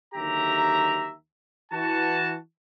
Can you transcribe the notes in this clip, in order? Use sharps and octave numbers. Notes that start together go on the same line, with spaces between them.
D#2 D3 F#3 G4 E5 A#5
E3 F#4 A5